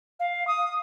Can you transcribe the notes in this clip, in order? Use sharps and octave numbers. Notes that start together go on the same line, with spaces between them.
F5
D#6